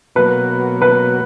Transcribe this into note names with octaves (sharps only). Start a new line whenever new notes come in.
B2 F#3 A#3 B4
B4